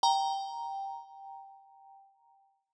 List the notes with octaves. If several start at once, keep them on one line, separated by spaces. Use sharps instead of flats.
G5 A#5